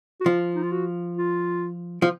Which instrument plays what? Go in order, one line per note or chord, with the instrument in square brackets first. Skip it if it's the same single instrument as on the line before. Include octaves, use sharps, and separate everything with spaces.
[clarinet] F#4
[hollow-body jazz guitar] F3 [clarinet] F4
[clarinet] D#4
F4
F#4
F4
[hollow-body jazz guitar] F3